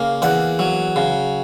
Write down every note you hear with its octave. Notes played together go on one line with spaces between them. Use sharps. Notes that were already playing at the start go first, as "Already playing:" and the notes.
Already playing: C#3 A#3
E2 F#5
F#3
C#3